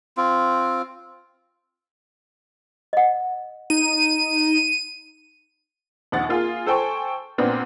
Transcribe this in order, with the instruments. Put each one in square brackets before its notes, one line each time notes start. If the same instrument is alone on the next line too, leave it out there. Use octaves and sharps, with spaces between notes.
[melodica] C4 F4
[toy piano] D#5 F#5
[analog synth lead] D#4 [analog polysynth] D#7
[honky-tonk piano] A#1 D#2 F#5 A6
A#3 F4 G#4
A4 C5 G5 G#5 C#6
A#2 B3 C4 D4